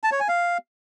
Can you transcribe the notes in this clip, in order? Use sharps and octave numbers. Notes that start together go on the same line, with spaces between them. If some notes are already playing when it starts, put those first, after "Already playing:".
A5
C#5
G#5
F5